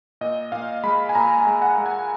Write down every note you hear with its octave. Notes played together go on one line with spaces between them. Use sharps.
A#2 D#5
A#2 F5
G#3 B5
G#5
A#2 A#5
G#5
G#3
F#5
G#3
G#5